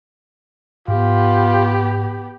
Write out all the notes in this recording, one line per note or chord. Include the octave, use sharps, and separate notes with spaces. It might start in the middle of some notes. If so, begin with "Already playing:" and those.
G#2 B3 F4 G4